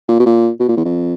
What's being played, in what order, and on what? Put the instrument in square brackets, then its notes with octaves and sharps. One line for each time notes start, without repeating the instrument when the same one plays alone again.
[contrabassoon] A#2
B2
A#2
B2
A#2
E2
F2